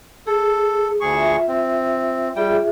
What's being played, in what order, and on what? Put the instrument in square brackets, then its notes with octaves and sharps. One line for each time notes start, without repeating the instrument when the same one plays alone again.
[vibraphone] G#4 [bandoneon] A4
[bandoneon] D2 G#4 C#6
[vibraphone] F4 E5
[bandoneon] C4
[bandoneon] G3 G5 [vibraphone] F4 G#4 E5